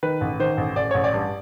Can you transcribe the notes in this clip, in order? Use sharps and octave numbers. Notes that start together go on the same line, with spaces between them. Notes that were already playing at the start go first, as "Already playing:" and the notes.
D#3 B4
A1
D#3 C5
A1
A1 D5
A1 C#5
D5
G2